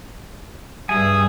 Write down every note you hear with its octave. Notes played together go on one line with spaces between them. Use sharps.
G2 G3 G#4 E5 G#5 D#6